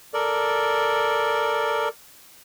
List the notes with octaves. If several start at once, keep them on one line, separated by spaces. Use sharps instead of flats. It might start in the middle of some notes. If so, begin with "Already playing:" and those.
A4 A#4 D5